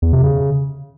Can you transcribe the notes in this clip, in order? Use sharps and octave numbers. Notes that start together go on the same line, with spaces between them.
E2
C3
C#3